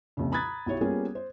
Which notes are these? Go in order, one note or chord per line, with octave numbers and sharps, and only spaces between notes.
C2 F2 A#2 C#3
A#5 B5 D#6 F#6 G#6 A6
B1 E4 G4 C#5
G3 A#3 B3 C#4 F4 G#4
C5